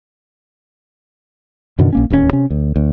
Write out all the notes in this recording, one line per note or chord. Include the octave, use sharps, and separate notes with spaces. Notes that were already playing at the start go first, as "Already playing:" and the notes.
F#2 B2 D3 D#3
A#1 A#3 C#4
D1 D#2 C#3 C#4
C3 C#4
D2
D2